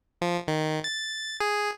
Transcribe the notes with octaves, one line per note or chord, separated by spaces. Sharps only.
F3
D#3
A6
G#4